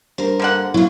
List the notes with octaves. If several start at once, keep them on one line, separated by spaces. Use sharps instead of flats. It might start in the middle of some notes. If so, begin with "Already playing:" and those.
G2 A#4 C5
D3 A#3 F#5
B1 F#3 E4 F4